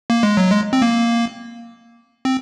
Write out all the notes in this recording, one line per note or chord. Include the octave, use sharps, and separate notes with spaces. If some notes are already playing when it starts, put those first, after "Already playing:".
A#3
G#3
F#3
G#3
C4
A#3
C4